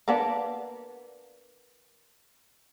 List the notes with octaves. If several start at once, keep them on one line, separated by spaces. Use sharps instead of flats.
A#3 B3 D4